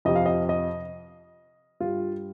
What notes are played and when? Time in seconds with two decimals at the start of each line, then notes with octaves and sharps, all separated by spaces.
0.05 F2 C3 F3 D#5
0.16 F5
0.26 D#5
0.49 D#5
1.80 G2 G3 F4